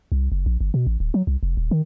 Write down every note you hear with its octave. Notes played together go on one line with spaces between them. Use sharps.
C2
F#1
A#1
G1
B2
A1
D1
F#3
C2
F1
D#1
D#3